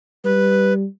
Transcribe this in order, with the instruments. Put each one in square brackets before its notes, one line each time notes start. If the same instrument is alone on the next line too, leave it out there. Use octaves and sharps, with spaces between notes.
[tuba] G3 [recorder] B4